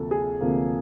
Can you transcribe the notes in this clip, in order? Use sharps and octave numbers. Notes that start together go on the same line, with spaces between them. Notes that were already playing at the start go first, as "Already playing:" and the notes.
Already playing: D2 C3 F3 A#3 A4
G#4
D2 C3 F3 A#3